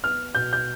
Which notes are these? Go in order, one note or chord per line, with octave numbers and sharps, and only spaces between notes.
B3 F6
B2 G6
G6